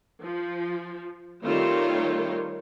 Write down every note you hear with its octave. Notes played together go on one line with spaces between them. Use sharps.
F3
D#3 G3 A3 C4 F4 C#5